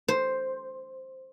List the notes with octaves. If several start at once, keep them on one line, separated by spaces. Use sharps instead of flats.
C5